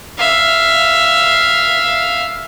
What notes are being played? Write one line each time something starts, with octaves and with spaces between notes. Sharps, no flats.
E5 F5